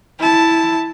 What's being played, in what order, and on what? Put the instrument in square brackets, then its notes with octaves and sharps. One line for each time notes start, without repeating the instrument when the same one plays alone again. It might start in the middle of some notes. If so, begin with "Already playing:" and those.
[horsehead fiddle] E4 A5